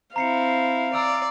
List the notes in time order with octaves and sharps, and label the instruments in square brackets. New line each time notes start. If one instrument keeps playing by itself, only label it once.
[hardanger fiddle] C4 E4 [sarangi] F5 [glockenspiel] A#5 C7 C#7
[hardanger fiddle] D5 [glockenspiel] A#5 E6 D7